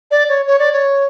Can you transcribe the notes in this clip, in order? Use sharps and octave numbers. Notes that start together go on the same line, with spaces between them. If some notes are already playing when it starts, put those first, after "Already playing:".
D5
C#5
C#5
D5
C#5